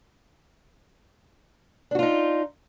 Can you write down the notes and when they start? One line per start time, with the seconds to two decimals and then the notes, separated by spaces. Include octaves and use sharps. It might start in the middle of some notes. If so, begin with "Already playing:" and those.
1.91 D4
1.95 F#4
1.99 F4
2.03 D#4